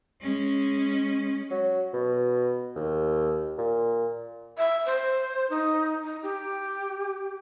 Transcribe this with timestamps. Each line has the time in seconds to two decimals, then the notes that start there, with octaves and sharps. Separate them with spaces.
0.21 G#3 C#4
1.51 F#3
1.93 B2
2.76 D#2
3.58 A#2
4.57 E5
4.86 C5
5.50 D#4
6.04 D#4
6.23 G4